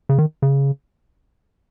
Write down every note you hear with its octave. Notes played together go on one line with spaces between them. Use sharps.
C#3
D#3
C#3